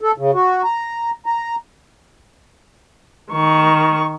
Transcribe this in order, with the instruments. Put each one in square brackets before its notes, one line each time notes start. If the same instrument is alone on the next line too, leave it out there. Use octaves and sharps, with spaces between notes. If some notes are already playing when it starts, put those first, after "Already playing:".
[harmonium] A4
C#3
F#4
A#5
A#5
[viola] D#3 C#6